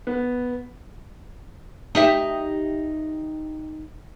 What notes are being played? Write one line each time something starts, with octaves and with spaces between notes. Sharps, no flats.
B3
D#4 G4 E5